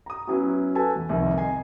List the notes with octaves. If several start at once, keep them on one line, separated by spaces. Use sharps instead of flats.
A#5 D#6
F#3 B3 C#4 E4 F#4
F#4 A4 B4 G#5 A5
E2
C2 F2 D#3
D#5 G#5 C7